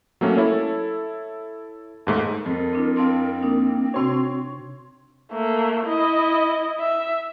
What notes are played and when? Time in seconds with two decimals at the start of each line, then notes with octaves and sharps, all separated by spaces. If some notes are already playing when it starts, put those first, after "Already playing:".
0.21 F#3 A3 A#3 C#4
0.37 E4 A4 C#5
2.07 D#2 G#2 A3 A#3
2.46 F2 A#4
2.73 C4 D4 E4
2.97 C4 F5 A5 C6
3.42 A#3 D4 D#4
3.94 C3 D4 F#4 C#5 C6 F7
5.32 A3 A#3
5.86 E4 D#5
6.80 E5